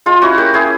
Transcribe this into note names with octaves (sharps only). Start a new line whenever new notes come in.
G#3 F4
C#4 E4 F#4
A#3 G4
C#4 E4 G#4